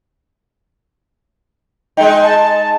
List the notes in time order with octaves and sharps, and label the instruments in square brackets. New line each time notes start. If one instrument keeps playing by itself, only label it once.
[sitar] G#3 D#4 [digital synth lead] G5
[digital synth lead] A5